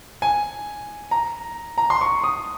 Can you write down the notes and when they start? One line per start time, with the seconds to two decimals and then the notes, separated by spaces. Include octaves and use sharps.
0.22 G#5
1.11 A#5
1.78 A#5
1.90 C6
2.01 C#6
2.24 D#6